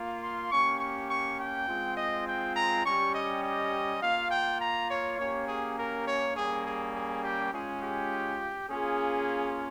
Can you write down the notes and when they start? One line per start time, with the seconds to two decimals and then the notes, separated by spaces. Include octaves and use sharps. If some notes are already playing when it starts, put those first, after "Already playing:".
Already playing: A#3 F4
0.22 C6
0.50 A#3 C#4 G4 C#6
0.79 C#6
1.09 C#6
1.38 G5
1.68 G#3 C4 F4
1.96 D#5
2.26 G5
2.55 A#5
2.84 G3 C#4 G4 C#6
3.14 D#5
3.43 D#5
4.01 A#3 F4 F5
4.30 G5
4.60 A#5
4.89 C#5
5.17 A#3 C#4 G4 C#5
5.47 G#4
5.77 A#4
6.06 C#5
6.35 G3 A#3 C#4 G#4
6.64 G#4
6.94 G#4
7.23 G4
7.51 G#3 C#4 F4 G#4
7.81 G4
8.68 A#3 C#4 F4 G#4